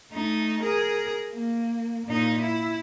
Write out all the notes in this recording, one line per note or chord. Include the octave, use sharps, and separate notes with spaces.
A3 D#4
G#4 A#4
A#3
A#2 D#4
E4